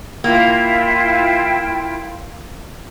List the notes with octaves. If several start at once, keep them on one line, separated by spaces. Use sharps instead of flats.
A#3 E4 F4 G5